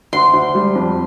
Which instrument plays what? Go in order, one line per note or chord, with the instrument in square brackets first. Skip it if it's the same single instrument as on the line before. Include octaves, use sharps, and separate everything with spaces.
[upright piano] D2 [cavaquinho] C6
[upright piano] D2
G3
F2